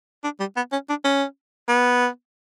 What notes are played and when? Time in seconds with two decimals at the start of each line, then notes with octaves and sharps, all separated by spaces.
0.24 D4
0.40 G3
0.56 B3
0.72 C#4
0.89 D4
1.04 C#4
1.68 B3